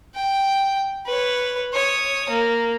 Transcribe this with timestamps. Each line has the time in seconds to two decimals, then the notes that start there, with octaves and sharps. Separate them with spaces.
0.15 G5
1.06 B4 C#5
1.73 C#5 D#6
2.29 A#3